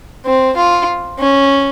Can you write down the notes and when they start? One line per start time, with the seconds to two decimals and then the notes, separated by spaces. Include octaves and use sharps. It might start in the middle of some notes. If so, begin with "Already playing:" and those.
0.25 C4
0.57 F4
1.19 C#4